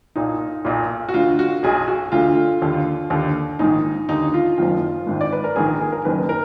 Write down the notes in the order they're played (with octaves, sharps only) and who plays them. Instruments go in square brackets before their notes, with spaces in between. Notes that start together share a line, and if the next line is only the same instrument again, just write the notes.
[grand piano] B1 A#2 D#4
B1 A#2
F#4
D2 D3 F4
F#4
B1 B2 G#4
F#4
D2 D3 F4
D#2 D3
D#2 D3
A#1 G#2 D#3 D#4
D#2 D3 D#4
F4
F#1 F#2 D#3
G#1 G#2 D#3
D5
B4
A#4
A#1 G#2 D#3 G#4
A#4
G#4
A#4
F#1 F#2 D#3 B4
A#4